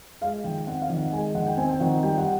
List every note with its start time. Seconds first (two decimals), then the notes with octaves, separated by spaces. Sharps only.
0.21 G#3 F5
0.44 D#3 G5
0.67 C4 F#5
0.82 F5
0.89 D#3
0.97 F#5
1.12 G#3 G#5
1.35 D#3 F#5
1.47 G5
1.57 C4 G#5
1.69 G5
1.80 D#3 F#5
2.03 G3 G5
2.18 F#5